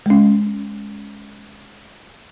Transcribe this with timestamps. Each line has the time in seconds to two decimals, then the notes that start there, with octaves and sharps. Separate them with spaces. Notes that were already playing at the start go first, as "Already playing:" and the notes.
0.06 G#3 C#4